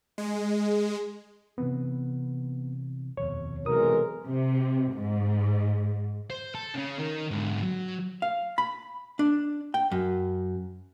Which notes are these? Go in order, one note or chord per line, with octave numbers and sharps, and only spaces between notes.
G#3
C3 E3 B3 C4
D#1 F2 B2 C#5
B1 C3 E3 G#3 A#4 D#6
C3
G#2
C5
A4
C#3 C#4
D#3 A#4
G#2 D3
F#3
F5
B5
D4
G5
F#2